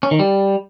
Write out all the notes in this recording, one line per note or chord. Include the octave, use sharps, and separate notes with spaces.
C#4
D#3
G3